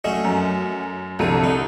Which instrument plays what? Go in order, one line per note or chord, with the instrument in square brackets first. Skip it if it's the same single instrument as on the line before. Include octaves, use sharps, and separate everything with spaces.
[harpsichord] F#3 A3 C#4 [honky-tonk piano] D#5
[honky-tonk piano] F#2
[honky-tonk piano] C2 A4 D#7 [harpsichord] F2 D3
[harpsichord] D#4